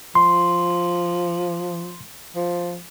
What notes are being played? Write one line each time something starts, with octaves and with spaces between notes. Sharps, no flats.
F3 C6
F3